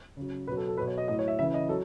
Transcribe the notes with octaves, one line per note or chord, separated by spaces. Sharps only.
C#3 F#3
B2 F#3 B4
A4
A4
B2 F#3 B4
C#5
D#5
A2 F#3 D#5
C#5
E5
C#3 E3 E5
D#5
F#3 A4